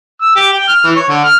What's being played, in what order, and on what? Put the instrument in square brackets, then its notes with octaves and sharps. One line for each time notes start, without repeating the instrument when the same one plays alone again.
[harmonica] E6
G4
G5
F6
E3
C#5
D3
F6